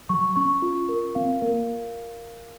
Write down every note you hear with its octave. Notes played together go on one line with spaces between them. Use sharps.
F#3 C#6
C#4 C#6
F4
A#4
C4 F5
A#3 A#4